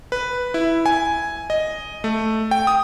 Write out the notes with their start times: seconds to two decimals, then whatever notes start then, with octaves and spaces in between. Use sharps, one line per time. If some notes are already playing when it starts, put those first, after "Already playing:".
0.12 B4
0.54 E4
0.86 G#5
1.50 D#5
2.04 A3
2.51 G5
2.67 D#6